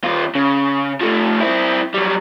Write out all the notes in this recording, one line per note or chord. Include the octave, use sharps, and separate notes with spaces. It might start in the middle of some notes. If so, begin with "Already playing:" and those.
D#2 F4
C#3
F3 A3
C4 E4
F#3 G3